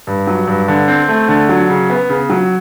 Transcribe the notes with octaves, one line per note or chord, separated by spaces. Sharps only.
G2
F#3
G2
D3
C4
A3
D3
F#3
C#3
B3
C#3
F#3